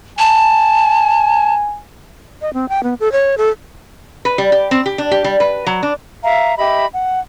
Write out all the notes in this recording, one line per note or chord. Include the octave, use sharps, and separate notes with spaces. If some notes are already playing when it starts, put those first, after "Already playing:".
G#5 A5
D#5
C4
G5
B3
A4
C#5
A4
B4
G3
G4
C4
G4
D4
G4
G3
B4
F#3
D4
E5 F5 A#5
G4 D#5 E5 B5
F#5